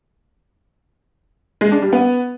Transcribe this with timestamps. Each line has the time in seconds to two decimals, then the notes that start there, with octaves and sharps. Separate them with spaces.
1.61 G#3
1.72 D4
1.82 G3
1.93 B3